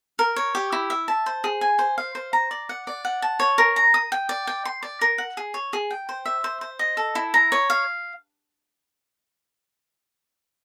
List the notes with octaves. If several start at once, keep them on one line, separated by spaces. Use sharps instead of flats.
A#4
C#5
G4
E4
E5
A5
C5
G#4
G#5
C5
F5
C5
A#5
D5
F#5
D5
F#5
A5
C#5
A#4
A#5
D#6
G5
D5
G5
C6
D5
A#4
F#5
G#4
C#5
G#4
G5
C5
E5
C5
C5
D#5
A4
E4
A#5
C#5
F5